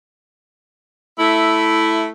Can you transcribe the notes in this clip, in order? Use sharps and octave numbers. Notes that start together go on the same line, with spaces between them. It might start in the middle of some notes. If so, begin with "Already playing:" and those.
A3 E4